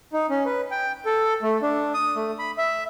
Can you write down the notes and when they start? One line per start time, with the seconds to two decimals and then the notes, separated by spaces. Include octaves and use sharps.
0.13 D#4
0.30 C#4
0.45 B4
0.71 G5
1.06 A4
1.42 A3
1.62 D4
1.94 D#6
2.15 A3
2.39 B5
2.58 E5